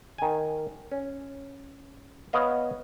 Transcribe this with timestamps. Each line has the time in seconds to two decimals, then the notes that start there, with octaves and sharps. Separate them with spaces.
0.18 D#3 G#5
0.92 C#4
2.33 B3 C#5 D#5 F5